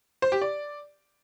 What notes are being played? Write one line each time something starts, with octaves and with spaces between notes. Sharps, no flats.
C5
G4
D5